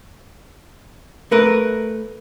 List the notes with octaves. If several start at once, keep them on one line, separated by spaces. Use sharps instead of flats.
A3 A#4 B4